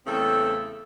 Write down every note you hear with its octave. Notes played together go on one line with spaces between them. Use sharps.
E2 C#3 A3 C4 A4